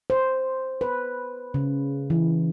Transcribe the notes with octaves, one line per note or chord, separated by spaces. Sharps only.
C5
B4
C#3
E3